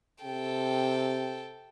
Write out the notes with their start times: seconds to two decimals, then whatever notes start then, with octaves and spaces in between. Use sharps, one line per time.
0.24 C3 A4 G5